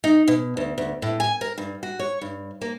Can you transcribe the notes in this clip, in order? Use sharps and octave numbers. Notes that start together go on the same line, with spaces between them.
D#4
B2
D2
D2
A2
G#5
A#4
G2
F#4
C#5
G2
A#3